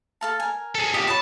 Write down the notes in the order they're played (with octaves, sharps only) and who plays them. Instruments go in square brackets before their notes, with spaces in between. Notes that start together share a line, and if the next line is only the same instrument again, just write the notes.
[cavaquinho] A4 F5 A5
A#4 G#5
[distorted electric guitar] G#4 A4
[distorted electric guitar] F4 G4 [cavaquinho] D#5
[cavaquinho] C#5 D#5 B5 [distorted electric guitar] A5